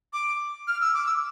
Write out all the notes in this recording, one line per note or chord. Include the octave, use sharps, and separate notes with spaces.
D6
F6
E6
D6
E6